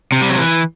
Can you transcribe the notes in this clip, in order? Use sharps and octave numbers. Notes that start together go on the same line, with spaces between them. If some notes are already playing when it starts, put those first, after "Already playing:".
C3
G3
F#3
E3